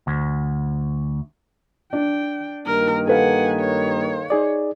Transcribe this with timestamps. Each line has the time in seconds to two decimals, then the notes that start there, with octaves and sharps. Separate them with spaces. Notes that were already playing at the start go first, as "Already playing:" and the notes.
0.07 D2
1.93 D4 G5
2.66 G2 D#3 A#3 A#4
3.07 A4 B4 F5 F#5 G#5
3.60 C#5
4.30 D#4 G#4 D5